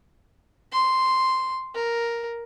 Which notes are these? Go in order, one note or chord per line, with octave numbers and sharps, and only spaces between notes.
C6
A#4